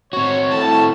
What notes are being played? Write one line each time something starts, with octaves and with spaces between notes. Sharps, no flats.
C4 F#4 C#5
A2 A5